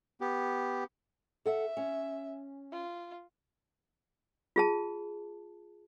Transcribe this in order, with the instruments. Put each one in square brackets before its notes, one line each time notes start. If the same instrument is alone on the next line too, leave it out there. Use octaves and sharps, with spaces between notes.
[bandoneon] B3 G4
[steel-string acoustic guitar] A4 F#5 [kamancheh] E5
[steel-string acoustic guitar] C#4
[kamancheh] F4
[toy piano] F4 G#4 A5